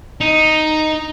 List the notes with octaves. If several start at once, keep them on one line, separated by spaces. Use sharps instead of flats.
D#4